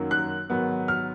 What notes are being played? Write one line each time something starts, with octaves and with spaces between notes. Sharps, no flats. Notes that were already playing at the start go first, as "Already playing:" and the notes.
Already playing: F#2 D#3 F#3 A#3
F#6
G#2 D#3 F#3 B3
F6